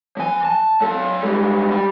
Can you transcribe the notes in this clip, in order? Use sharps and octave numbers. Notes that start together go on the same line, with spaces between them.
F3 G#5
A5
F#3 A4
G#2 G3
G3